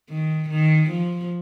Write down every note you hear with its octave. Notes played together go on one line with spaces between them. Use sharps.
D#3
D#3
F3